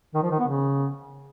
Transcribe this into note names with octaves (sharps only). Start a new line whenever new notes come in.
D#3
F3
D#3
B3
C#3